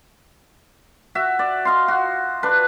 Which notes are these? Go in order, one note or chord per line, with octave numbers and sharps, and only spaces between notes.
F#4 E5
D5
D#5 F5 C6
F#4
D4 B4